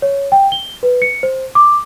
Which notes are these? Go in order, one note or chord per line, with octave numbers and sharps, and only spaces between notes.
C#5
G5
G7
B4
C#7
C5
D6